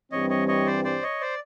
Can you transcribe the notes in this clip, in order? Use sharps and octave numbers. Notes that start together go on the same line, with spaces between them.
G2 E3 G3 C4 C#5 D#5
C#5 D#5
C#5 D#5
C5 D5
C5 D5
C#5 D#5
C5 D5